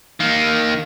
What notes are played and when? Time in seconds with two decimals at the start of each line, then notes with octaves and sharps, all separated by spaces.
0.20 D#3 A#3